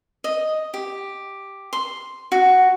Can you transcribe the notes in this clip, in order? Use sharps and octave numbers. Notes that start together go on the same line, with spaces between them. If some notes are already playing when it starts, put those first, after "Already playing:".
D#5
G4
C6
F#4